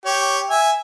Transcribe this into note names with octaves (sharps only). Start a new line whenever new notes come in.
G4 C#5
E5 G#5